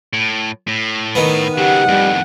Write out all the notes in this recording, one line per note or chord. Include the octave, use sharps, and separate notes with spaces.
A2
A2
D#3 B3
C#3 F#3 G4 F#5
F2 A2 G3